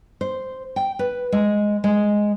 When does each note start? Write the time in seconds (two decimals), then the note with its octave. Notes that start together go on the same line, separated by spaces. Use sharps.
0.21 C5
0.76 G5
0.99 B4
1.32 G#3
1.84 G#3